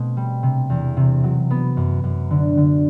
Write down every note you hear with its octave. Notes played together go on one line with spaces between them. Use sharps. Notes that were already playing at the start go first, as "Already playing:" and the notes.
Already playing: B2 A3 C4
G3
C3
E2
C3
F#3
B3
F#2
F#2
D3
D3